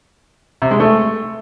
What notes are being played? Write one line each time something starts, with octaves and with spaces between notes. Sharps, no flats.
C3
G#3
A3